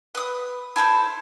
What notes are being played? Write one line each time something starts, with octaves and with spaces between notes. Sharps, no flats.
B4 D#6
E4 A4 A#4 C5